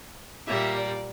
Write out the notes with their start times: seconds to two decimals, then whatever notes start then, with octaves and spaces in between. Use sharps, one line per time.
0.47 A#2 G3 A#3 E5
0.76 D5